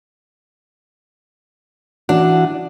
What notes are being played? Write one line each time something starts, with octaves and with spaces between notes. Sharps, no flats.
E3 D4 F#4 F#5